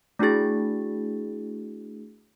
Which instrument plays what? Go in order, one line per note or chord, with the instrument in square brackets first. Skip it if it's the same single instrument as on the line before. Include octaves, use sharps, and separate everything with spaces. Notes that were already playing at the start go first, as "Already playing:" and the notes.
[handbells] A3 D4 E4 F#4 G#4 A6